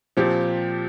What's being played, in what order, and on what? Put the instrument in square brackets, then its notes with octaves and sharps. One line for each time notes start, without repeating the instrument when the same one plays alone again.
[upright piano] A#2 F3 C4 G4